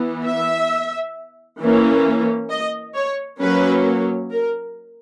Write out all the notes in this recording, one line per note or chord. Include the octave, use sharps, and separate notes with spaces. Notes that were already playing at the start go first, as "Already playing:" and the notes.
Already playing: E3 B3
E5
E3 A#3 C#4
D#5
C#5
F#3 A#3 C#4 B4
A#4